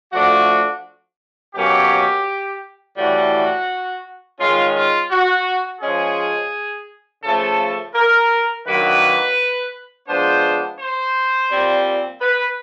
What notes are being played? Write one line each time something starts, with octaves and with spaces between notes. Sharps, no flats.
F3 A3 D4 F#4
B2 F#3 A#3 C#4 G4
A2 E3 G3 F#4
D#3 G#3 C#4 F4
F4
F#4
F3 G#3 C#4 G#4
C#3 F3 A3 A4
A#4
D#3 F#3 A#3 D4 B4
F3 G#3 B3 D4 C5
C5
A#2 G3 C4
B4